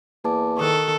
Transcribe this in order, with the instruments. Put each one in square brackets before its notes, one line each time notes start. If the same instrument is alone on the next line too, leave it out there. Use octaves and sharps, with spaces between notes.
[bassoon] E2 [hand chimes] A#3 A5 D6
[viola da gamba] D#3 A4 [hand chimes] C#6 D#6 F#6